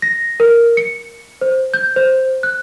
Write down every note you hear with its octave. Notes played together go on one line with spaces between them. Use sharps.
A#6
A#4
C#7
C5
G6
C5
F#6